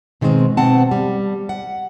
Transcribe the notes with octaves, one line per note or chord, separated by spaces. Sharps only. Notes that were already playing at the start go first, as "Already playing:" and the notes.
B2 D#3 G#3 C4
B2 C4 F#5 A5
G3
F#5